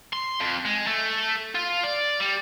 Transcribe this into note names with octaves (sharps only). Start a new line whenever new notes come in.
C6
F2
G#3
A3
F4
D5
G3